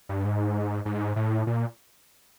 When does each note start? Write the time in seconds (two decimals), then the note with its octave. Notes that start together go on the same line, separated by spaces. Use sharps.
0.09 G2
0.25 G#2
0.85 G#2
1.16 A2
1.47 A#2